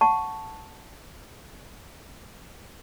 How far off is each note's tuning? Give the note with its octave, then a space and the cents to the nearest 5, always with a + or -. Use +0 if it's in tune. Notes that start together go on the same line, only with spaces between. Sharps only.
F#5 +0 A5 +0 C#6 +0